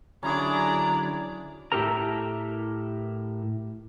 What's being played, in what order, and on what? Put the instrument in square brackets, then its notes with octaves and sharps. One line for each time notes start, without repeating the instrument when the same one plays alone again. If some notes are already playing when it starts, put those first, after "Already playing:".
[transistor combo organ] D3 F#3 [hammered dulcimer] C#4 E4 G#4 [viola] D4 D5 [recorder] A#5
[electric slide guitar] A2 E4 G4 A4 A#4 A#5